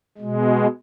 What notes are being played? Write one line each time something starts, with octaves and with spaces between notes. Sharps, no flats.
B2 G#3